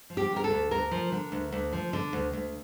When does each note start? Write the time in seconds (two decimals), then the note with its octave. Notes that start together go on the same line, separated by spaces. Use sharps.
0.10 F3
0.17 G4
0.31 D3
0.36 A#4
0.44 A4
0.50 D2
0.71 D2 A#4
0.91 F3
1.12 D3
1.32 D2
1.52 D2
1.73 F3
1.93 D3
2.13 D2
2.33 D2